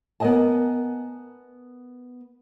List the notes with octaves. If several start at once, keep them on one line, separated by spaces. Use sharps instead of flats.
B3 A#4 B4 D#5 G#5 A5